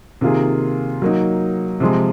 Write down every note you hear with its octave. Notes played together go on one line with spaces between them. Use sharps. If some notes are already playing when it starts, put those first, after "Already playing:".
C3 D#3 A#3 F4 G#4
F#3 A#3 D#4
C3 F3 G#3